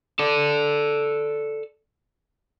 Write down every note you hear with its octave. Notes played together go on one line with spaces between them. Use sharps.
A4 D5